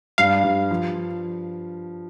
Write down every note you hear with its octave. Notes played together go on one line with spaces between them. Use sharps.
G2 F5
G2
F3